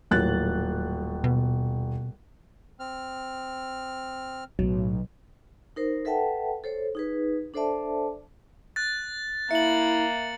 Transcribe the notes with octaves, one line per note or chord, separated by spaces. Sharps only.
D#1 A2 F#3 F#6 A6
B2
C4 F6
B1 A2 F#3
D#4 A#4 C5
A4 B4 E5 F#5 G5 A5
A4 C5 C#5
D#4 G#4 B4
D4 A4 C5 D5 E5 A5
F#6 A6
A#3 E4 E5 C#7 F#7